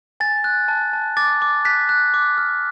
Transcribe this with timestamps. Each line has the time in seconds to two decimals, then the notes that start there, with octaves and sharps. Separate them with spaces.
0.20 G#5 A6
0.44 F#6
0.68 A5
0.93 A5
1.17 D6 A6
1.42 D6
1.65 F#6 B6
1.89 F#6
2.14 D6
2.37 F6